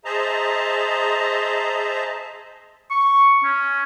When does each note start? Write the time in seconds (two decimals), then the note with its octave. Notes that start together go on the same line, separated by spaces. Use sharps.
0.05 G#4 C5 D#5 E5 A5 A#5
2.91 C#6
3.44 C#4